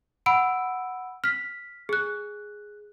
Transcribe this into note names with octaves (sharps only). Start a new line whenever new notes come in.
F#5 B5 E6 D7
F6 B6
G#4 F#6